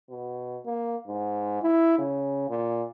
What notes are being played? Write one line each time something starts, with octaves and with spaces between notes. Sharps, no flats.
B2
A#3
G#2
E4
C#3
A#2